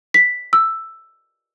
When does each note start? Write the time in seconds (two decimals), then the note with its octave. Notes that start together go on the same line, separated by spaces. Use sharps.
0.14 B6
0.53 E6